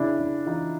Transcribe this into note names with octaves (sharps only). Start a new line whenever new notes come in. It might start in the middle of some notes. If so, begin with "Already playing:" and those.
Already playing: C#3 D4 E4
C#3
E3 D#4 F4